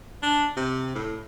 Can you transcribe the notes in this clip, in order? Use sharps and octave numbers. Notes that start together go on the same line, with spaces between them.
D4
C3
A2